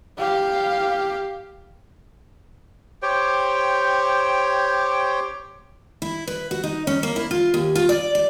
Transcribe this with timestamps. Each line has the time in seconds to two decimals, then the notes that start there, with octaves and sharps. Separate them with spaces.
0.18 G4 F5
3.02 G4 C5 C#5 G5
6.02 E4
6.27 B4
6.51 F#4
6.64 D#4
6.87 C#4
7.03 A#3
7.16 E4
7.31 F4
7.54 D#2
7.75 F4
7.89 D5
8.15 D5